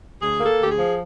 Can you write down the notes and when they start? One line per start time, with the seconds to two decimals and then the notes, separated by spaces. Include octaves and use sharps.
0.21 D2 G#4
0.39 A#3
0.46 A4
0.58 D2 G4
0.70 G#4
0.76 F3